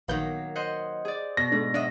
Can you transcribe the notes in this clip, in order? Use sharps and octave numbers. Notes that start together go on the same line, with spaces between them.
A#1 D#3 F#3 A#3 B3 G6
C5 D#5 F#5
G#4 D5
B2 A#6
G#2 A3 D4
F#3 D4 D#5 E5